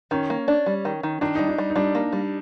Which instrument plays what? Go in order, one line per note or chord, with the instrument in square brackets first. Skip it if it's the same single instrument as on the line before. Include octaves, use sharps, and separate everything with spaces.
[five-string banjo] D#3 [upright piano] C#4
[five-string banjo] A#3
D4
G3
D#3
D#3
[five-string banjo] D#3 [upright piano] D4
[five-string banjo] G3 [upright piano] D#4
[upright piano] D4
[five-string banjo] G3
[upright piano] D#4
[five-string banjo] G3 [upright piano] D4
[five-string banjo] A#3
G3